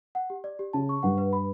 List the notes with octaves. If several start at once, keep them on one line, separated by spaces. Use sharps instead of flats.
F#5
G4
D5
G4
C#3 A5
C#6
G2 F#5
B4
B5